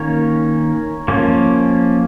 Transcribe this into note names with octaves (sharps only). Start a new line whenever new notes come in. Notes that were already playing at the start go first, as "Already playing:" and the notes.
Already playing: D#3 A#3 C#4 A#4 C#5
F3 A#3 C#4